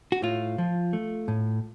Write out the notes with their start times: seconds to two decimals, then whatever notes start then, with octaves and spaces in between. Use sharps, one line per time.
0.12 F#4
0.22 A2 F4
0.58 F3
0.93 A3
1.28 A2